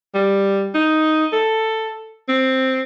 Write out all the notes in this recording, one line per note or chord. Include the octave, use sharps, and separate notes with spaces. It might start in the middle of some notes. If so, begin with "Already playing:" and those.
G3
D#4
A4
C4